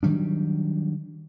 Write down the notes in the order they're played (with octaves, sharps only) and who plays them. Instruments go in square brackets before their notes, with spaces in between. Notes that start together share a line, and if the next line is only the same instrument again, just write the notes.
[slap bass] D#3 F#3 G3 D4